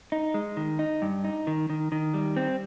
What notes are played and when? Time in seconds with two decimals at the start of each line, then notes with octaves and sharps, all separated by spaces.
0.12 D#4
0.34 G#3
0.57 D#3
0.79 D#4
1.02 G2
1.24 D#4
1.47 D#3
1.70 D#3
1.92 D#3
2.14 G3
2.37 C4